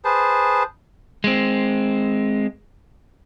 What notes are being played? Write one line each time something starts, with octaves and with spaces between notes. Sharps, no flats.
G#4 B4 C5 A5
G#3 C4